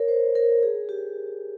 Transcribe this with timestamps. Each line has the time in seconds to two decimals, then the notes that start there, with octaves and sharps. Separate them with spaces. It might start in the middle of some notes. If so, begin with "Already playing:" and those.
Already playing: A#4 C#5
0.08 C5
0.35 A#4
0.63 G#4
0.89 G4